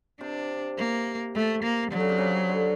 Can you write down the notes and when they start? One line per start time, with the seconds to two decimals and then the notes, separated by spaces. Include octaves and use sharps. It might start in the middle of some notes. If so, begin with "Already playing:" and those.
0.21 C3 D4
0.77 A#3
1.35 A3
1.63 A#3
1.91 D3 F#3
2.00 C#3
2.09 C3
2.18 C#3
2.49 D3